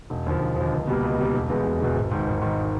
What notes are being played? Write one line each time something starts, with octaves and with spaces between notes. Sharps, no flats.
E1
D#2 D3 F3
E1
D#2 D3 F3
C#2
B2 G3 A#3
C#2
B2 G3 A#3
E1
E2 B2 G#3
E1
E2 B2 G#3
G#1
G#2 D#3
G#1
G#2 D#3